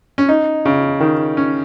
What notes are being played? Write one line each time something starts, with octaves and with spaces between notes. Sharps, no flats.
C#4
D#4
C#3
D#3
C#4